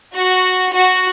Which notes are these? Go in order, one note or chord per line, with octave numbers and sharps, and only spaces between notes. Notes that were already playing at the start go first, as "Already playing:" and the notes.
F#4
F#4